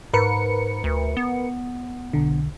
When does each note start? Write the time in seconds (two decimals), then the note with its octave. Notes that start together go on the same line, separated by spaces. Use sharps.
0.13 G#2 A#4 B4 C#7
0.84 D2
1.17 B3
2.13 B1 D3